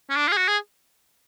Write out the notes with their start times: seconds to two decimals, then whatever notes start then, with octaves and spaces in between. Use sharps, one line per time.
0.09 C#4
0.16 D4
0.27 F4
0.32 G#4
0.37 F#4
0.48 G#4